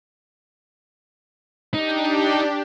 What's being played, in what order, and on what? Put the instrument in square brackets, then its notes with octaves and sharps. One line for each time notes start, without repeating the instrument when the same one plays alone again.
[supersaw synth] D4 G4 [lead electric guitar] D#4